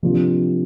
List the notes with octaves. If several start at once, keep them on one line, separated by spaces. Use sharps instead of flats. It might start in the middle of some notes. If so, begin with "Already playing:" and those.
C3 F3 A#3 D4